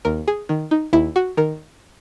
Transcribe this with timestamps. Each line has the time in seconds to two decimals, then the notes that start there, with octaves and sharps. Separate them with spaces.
0.05 D#2 A#4
0.28 G#4
0.49 D#3
0.71 D#4
0.93 D#2 E4
1.16 F#4
1.37 D#3 A#4